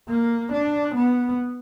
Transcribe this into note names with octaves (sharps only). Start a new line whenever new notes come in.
A#3
D4
B3